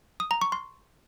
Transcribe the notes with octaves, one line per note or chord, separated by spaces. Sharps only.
D#6
A#5
C#6
C6